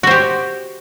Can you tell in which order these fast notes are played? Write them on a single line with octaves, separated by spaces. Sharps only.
F#4 C5 G4